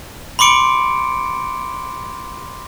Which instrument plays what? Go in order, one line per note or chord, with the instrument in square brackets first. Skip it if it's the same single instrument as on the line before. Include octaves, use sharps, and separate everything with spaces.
[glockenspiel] B5 C6 D6 C#7 D7